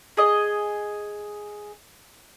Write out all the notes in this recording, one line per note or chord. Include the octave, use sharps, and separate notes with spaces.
G#4 D#5